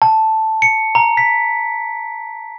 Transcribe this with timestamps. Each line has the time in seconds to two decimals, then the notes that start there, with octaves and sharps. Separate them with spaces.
0.02 A5
0.62 C#7
0.95 A#5
1.17 B6